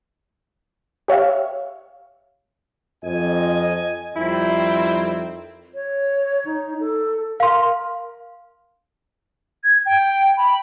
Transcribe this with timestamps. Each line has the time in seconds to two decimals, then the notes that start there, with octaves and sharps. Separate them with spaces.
1.08 G4 C#5 E5 F5
3.04 F2 D#5 G#5
4.16 F2 D#3 G3 C4 E4
5.75 C#5
6.45 D#4
6.80 A4
7.40 A#4 F5 C6
9.64 G#6
9.86 G5
10.37 B5